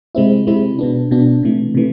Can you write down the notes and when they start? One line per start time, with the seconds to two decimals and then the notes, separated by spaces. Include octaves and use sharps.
0.15 C3 G#3 C4 E4
0.47 C3 G#3 C4 E4
0.79 B2 B3 D4
1.11 B2 B3 D4
1.43 C3 E3 A3
1.75 C3 E3 A3